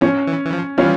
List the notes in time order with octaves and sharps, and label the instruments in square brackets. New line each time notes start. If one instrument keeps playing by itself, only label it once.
[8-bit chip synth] F3 [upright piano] C#4
[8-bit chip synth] E3
E3
F3
[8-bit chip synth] E3 G3 [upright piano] C#4 F4